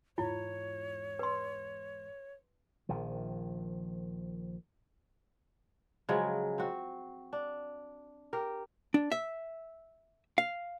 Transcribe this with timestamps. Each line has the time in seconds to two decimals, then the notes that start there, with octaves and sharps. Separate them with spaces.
0.18 E2 G#2 E4 F4 C#5
1.19 B4 C6
2.89 A#1 D#3 F3
6.09 C#3 F3 F#3 G#3
6.58 C4 F#4
7.33 D4
8.33 G4 A#4
8.94 D4
9.12 E5
10.38 F5